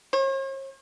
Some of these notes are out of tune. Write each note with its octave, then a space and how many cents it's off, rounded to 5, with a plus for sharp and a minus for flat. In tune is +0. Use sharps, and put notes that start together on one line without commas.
C#5 -45